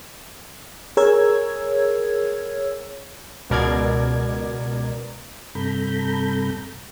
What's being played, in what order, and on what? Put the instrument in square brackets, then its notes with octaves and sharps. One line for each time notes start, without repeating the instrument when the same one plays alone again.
[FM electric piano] G#4 A#4 C#5 E6 G#6
[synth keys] C#2 B2 A#4 D5 G#6
[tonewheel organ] G2 C3 A4 A#5 B5 G6